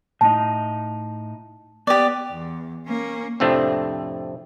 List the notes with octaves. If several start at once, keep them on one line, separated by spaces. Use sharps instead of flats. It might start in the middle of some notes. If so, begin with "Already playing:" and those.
A2 D#4 A5
B3 G4 D5
E2
A#3 C#4
F2 A2 C3 A3 C4 D4